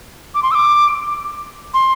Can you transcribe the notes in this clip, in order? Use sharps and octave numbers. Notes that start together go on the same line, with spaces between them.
D6
C6
E6
D6
C6